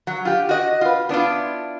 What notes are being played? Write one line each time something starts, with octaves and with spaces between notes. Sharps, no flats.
F#3
F4 G4
F#4 D#5
F4 B4
B3 D4 E4 F4